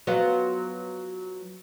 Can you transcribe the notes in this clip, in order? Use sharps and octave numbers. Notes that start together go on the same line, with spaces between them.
F#3 B3 F4